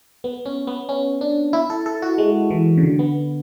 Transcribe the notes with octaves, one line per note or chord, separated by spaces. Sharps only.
B3
C#4
B3
C#4
D4
E4
A4
A4
F#4
G#3
E3
C#3
D3
B3